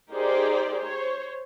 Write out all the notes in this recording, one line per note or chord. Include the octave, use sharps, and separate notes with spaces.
D#4 G4 G#4 A#4 C5 D5
C5 C#5